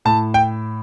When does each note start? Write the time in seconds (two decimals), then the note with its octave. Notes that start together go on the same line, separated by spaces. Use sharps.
0.05 A2 A5
0.34 G5